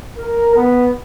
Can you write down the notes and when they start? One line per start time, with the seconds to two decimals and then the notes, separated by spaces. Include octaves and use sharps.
0.18 A#4
0.55 B3